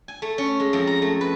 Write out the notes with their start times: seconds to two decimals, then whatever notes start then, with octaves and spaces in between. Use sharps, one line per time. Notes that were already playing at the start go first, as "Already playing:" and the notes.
0.08 G#5
0.22 A3
0.38 C#4
0.60 G#3
0.73 F2
0.87 A#5
1.02 A3
1.21 B4